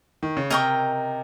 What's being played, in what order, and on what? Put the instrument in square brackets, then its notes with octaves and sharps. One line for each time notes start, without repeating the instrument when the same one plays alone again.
[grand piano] D#3
C#3
[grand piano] C3 [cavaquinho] A#4 D#5 G5 C#6